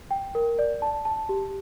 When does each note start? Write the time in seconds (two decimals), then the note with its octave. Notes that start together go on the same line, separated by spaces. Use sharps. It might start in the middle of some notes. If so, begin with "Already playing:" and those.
0.11 G5
0.35 A#4
0.59 D5
0.82 A5
1.05 A5
1.29 G4